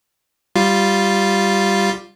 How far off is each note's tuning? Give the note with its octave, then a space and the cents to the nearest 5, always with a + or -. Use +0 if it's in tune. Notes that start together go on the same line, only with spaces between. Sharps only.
G3 +0 F4 +0